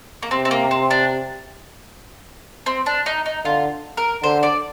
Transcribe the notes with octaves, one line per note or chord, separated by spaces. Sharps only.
A#3
C3 C4
C4
A#3
C4
D4
C4
D4
D#4
D#4
D3 F4
A#4
D3 C5
D5